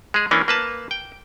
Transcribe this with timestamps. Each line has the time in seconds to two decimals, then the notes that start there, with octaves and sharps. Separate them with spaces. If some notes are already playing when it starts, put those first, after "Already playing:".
0.14 G#3 G#4
0.31 E3 A#3 C#4 D4
0.48 A#3 B4 A5
0.91 G5